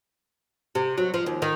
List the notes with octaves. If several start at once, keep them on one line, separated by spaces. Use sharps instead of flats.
C3
F#3
F3
D#2
D#3